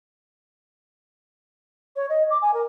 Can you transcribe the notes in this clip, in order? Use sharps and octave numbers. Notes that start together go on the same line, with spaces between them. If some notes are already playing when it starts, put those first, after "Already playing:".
C#5
D#5
D6
G#5
A#4